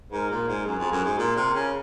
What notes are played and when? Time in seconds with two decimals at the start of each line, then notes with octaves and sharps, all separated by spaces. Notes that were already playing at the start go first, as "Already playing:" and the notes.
0.12 G#2 A#4
0.30 A#2
0.47 G#2
0.66 F#2 G#4
0.79 F2
0.92 F#2
1.04 G#2
1.18 A#2 A#4
1.37 C3
1.54 C#3